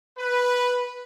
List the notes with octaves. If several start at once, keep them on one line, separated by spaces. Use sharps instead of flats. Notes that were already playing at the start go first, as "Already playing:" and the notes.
B4